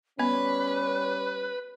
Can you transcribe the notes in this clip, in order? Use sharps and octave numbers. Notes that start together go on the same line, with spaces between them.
G3 B3 C#4 B4 B5